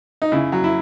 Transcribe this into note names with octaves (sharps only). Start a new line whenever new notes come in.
D#4
C#3 E4
F#3
E4